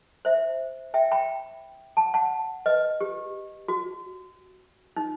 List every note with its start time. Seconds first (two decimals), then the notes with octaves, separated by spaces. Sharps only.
0.25 C5 E5
0.94 E5 G5
1.11 G5 B5
1.97 F#5 A5
2.14 F#5 A5
2.66 B4 D#5
3.01 G4
3.68 F#4
4.96 D#4